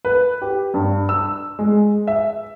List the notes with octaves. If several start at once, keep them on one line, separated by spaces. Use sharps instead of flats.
B4
G4
G2
E6
G#3
E5